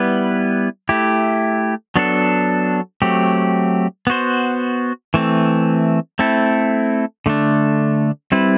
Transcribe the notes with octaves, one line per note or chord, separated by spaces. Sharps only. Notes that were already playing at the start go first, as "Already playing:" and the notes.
Already playing: G3 B3 E4 B4
A3 E4 G4
F#3 B3 D4 A4
F#3 A3 C4 G4
B3 F#4 C5
E3 A3 C4
A3 C4 E4 A4
D3 A3 D4
G3 C4 E4 B4